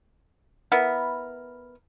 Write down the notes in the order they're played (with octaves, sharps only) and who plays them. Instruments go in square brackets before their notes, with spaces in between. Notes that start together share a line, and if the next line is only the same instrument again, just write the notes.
[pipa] B3 E4 A#4